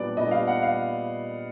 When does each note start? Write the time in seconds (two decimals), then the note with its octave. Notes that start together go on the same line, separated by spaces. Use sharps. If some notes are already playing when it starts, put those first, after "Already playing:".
Already playing: A#2 G3 B3 D4 D5
0.17 A#2 G3 B3 D4 D#5
0.31 F5
0.47 F#5
0.63 F5